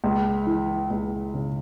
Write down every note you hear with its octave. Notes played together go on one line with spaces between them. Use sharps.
C#2
E3
C#2
C#3